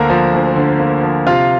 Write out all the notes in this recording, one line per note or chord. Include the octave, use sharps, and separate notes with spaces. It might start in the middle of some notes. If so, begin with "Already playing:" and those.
Already playing: D2 D3 A#3 A#4 C5 A#5
F3
D2
D3
A#3
F3
C3 F4 F5